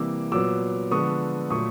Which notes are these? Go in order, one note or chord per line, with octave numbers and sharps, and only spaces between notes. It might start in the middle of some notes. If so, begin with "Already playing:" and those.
Already playing: C3 E3 G3 A#3 D6 E6
A#2 F#3 B3 D6 E6
D3 F3 G#3 B3 C#6 D#6
A#2 F#3 A3 C#6 D#6